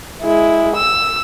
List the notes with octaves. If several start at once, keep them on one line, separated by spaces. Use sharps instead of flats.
G#3 E4
E6